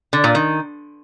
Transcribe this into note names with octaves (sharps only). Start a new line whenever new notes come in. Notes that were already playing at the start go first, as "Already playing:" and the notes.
D3
A#2
D#3